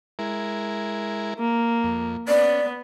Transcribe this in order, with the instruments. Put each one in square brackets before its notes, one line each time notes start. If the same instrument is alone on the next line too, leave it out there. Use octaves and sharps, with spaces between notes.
[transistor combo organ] G#3 E4 A#4
[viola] A#3
[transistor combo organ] F2
[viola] B3 [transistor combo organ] C#4 [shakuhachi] D5